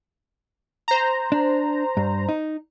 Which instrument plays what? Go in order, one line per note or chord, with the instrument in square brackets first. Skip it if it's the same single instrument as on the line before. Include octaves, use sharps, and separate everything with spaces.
[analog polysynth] C5 A#5
[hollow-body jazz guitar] D4
G2
D#4